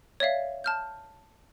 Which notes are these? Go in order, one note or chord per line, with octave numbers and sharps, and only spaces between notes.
C#5 D5 E5 F5
A5 F6 G6